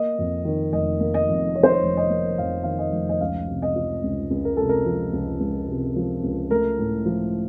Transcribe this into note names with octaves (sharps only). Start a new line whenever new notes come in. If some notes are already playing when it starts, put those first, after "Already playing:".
Already playing: A#3 D#5
F2
D#3
F1 D#5
A#3
D#5
F2
D#3 C#5
C5
C#5
F1
D#5
A#3
F2 F5
D#3 F5
D#5
F1
D#5
C#2 F5
C3
D#5
F3
C#2
C#2
A#4
C3 A4
A#4
F3
C#2
C#2
C3
F3
C#2
A3 A#4
A2
F3